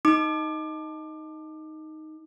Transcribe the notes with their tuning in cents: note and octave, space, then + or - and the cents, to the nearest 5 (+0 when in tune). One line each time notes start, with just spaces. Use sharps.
D#4 +5 D6 +25